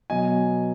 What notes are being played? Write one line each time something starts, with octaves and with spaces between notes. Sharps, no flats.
B2 F#3 D#5 G#5